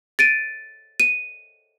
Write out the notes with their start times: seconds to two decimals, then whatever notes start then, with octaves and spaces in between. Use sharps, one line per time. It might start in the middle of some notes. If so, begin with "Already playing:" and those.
0.19 A6 D7 D#7
1.00 D#7